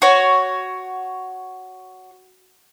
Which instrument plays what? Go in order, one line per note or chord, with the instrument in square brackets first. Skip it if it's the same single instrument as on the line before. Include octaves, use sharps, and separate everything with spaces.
[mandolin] F#4 C#5